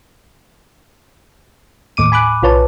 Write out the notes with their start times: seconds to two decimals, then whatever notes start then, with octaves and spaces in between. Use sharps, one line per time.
1.97 D#2 A2 D6 D#7
2.12 G#5 B5 D6 F#6
2.43 B1 F4 B4 C#5 A5